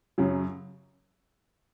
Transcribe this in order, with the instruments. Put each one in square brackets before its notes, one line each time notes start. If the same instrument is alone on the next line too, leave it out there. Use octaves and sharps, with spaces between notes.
[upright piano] F#2 C#3 F#3